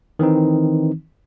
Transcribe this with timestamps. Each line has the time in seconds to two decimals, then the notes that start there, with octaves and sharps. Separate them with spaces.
0.19 D#3 E3 C4 D#4